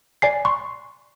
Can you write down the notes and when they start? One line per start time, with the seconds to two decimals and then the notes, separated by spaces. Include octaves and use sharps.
0.22 D5 G#5 C7
0.45 C6 C#6